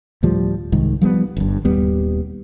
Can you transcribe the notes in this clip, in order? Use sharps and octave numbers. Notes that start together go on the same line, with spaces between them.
D2 A2 F3 G3
C2 G#2 D#3
F3 G3 A3 B3
G1 G2
D#1 D#2 G3 B3